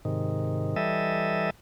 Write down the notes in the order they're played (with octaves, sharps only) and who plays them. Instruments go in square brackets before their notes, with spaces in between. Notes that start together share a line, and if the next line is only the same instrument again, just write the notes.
[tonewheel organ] G#2 C3 D#3
E3 G3 A4 D#5 E5